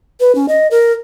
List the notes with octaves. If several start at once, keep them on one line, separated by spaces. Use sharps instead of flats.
B4
C#4
D#5
A#4